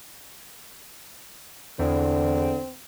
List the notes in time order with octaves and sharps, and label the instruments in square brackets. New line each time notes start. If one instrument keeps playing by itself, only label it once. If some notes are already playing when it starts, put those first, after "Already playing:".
[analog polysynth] E2 [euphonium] D3 [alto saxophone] C4